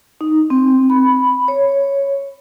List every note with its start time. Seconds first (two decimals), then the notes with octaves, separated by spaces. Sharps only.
0.21 D#4
0.50 C4
0.90 B5
1.48 C#5